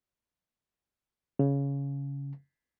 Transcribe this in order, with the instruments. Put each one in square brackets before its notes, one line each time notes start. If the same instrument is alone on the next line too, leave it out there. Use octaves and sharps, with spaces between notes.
[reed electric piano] C#3